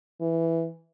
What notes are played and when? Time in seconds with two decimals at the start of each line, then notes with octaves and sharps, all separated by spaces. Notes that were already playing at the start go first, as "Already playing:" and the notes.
0.21 E3